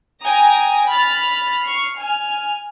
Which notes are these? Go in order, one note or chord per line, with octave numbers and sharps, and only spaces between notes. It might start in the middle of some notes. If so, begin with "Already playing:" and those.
G5 G#5 A#5 D#6 A#6
B5 F6 A6
C#6 F6 C7
G#5 F6